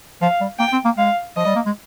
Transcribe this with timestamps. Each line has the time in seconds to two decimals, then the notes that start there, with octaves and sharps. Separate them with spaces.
0.22 F3 F5
0.41 G3
0.59 A#3 G5
0.73 C4
0.85 A#3
0.98 G#3 F5
1.37 F3 D#5
1.46 G3
1.55 A#3
1.66 G#3